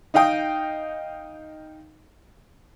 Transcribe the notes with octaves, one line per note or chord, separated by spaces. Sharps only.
D#4 D#5 F5 G5 D#6